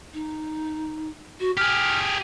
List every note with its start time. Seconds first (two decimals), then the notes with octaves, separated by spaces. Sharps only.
0.14 D#4
1.40 F#4
1.57 G4 G#4 F6